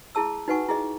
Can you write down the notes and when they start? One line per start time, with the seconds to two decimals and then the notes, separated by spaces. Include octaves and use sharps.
0.15 E4 G#4 A5 E6
0.48 D#4 F#4 B4 F#5 G#5 C#6
0.68 E4 G#4 D#5